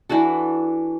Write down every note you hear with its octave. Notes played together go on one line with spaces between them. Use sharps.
E3 D4 F#4 A4